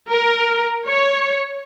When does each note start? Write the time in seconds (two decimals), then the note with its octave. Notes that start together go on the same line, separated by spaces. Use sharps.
0.11 A#4
0.88 C#5